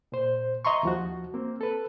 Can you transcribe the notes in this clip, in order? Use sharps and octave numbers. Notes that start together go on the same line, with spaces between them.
A#2 C5
D#5 E5 A#5 C6 C#6
D#2 F3 F#4
A#3 C4
A4 B4